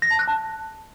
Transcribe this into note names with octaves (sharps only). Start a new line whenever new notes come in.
A#6
A5
F#6
A5